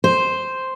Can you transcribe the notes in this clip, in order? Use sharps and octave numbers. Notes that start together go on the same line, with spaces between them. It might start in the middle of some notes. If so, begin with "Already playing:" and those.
C5